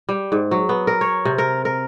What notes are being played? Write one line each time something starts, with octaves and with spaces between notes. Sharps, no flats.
G3
G#2
F#3
B3
A#4
C#5
C3
A#4
A#4